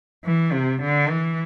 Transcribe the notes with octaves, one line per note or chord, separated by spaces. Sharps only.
E3
C3
D3
E3